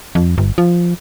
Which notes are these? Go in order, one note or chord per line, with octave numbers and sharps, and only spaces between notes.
F2
G1
F3